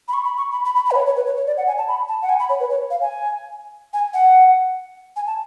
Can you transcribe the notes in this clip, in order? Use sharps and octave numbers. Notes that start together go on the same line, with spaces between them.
B5
C#6
B5
C#6
B5
B5
B5
B5
B4
C#5
C#5
B4
C#5
C#5
D5
F#5
G#5
A5
B5
A5
F#5
G#5
B5
C#5
B4
C#5
F5
G#5
G#5
F#5
G#5
A5